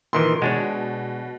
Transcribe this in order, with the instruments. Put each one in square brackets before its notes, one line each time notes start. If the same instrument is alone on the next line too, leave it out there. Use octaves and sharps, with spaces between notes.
[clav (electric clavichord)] A#2 D#3 E3 [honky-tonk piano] C6
[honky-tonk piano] B2 [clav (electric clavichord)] G#3 D4 C#5